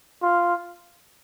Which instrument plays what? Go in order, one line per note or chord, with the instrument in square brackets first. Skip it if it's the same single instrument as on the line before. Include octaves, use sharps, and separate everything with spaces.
[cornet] F4